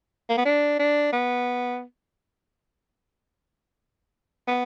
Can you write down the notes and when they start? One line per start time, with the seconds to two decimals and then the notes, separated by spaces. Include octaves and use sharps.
0.29 A#3
0.38 B3
0.45 D4
0.79 D4
1.13 B3
4.48 B3